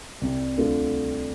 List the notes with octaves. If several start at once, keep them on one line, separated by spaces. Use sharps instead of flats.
C2 C3 G3
D2 D3 A3 C4 F4